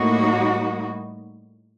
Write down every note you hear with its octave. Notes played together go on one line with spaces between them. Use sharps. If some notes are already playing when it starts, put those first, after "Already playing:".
Already playing: A2 G3 A#3 D#4 F#4